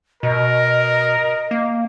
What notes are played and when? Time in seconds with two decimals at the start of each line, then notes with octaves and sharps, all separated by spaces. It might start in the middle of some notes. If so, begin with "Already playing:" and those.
0.23 B2 A#4 D#5
1.51 A#3